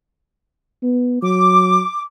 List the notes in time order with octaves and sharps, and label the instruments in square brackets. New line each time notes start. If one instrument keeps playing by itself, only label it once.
[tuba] B3
[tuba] F#3 [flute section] D6